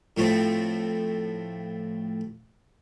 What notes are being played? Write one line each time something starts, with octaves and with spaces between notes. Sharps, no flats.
A2 F3 A3 C4